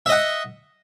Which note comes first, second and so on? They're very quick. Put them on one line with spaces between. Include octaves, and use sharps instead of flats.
E5 D#5 F#5